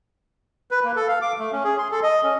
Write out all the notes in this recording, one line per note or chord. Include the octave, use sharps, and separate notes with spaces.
B4
A#3
A4
F5
D6
A3
C#4
G#4
C6
A4
D#5
C#4